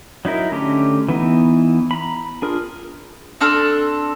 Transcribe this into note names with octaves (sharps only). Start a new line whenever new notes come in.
F#3 D#4 E4 A#4
D3 A3 C#4 G4 A#5
E3 B3 D#4
A#5 B5
D4 F4 G#4 A#4
C4 D4 A4 F6